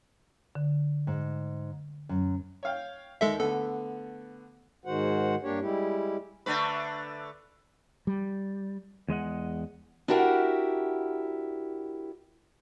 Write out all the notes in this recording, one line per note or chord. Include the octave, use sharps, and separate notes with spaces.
D3
G#2
F#2
C#5 F5 G5
D#2 D#3 G#3 A4 E5
D3 A3 B3 A4
G#2 D#3 G#3 F#4 C5 F#5
G2 A#3 D4 G4 C#5
G3 G#3 E4 G4
D3 A3 B4
G3
E2 G#3 D#5 F#5
D4 E4 F#4 G4 A#4 F#5